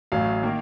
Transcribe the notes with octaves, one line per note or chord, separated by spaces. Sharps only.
A1 A2 F#3 F5
D#3 A#3